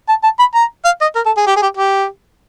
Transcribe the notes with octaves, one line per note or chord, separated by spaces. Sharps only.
A5
A5
B5
A#5
F5
D#5
A#4
A4
G#4
G4
G#4
G4
G4